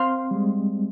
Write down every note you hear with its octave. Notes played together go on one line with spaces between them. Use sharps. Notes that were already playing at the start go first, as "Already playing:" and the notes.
Already playing: C4 C5 F5 C6
G3
G#3